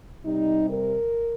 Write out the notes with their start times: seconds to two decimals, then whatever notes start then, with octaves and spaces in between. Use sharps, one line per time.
0.25 C3 G3 D#4
0.70 A#4